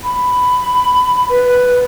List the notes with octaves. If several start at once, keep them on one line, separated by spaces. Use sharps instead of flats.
B5
B4